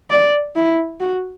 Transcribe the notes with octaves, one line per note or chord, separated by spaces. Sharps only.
D5
E4
F#4